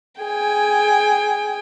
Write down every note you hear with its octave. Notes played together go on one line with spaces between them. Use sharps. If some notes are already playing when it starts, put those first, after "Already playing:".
G#4 G5 G#5